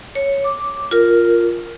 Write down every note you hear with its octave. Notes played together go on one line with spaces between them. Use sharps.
C#5
D6
F4 A#4